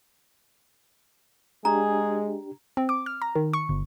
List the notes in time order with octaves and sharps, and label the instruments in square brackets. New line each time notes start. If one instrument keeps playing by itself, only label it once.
[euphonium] G#3 [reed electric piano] D4 G4 [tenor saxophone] G#4 [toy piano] A#5
[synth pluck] C4
D6
F6
A#5
D#3
C#6
G1